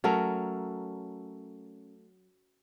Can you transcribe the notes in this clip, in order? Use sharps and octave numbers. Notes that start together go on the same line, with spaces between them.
F#3 A3 C#4 A#4